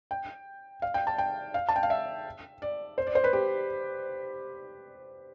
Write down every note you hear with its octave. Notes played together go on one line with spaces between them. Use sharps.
G5
F5
G5
A5
G5
F5
A5
G5
F5
E5
D5
C5
D5
C5
B4
G4